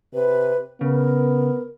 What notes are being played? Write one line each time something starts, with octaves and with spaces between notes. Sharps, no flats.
C3 B4
C#3 B3 A#4